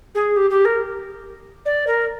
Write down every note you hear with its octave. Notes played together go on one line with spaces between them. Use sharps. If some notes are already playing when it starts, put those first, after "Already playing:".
G#4
G4
G4
A#4
D5
A#4